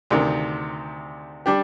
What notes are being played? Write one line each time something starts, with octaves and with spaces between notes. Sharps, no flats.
D2 C3 D#3
G3 D4 G4